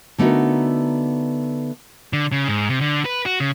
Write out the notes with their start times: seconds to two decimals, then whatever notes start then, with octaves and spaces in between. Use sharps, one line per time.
0.18 D3 A3 B3 D#4 F#4 A#4
2.13 D3
2.32 C#3
2.48 G#2
2.69 C3
2.81 D3
3.05 B4
3.26 F#4
3.40 C#3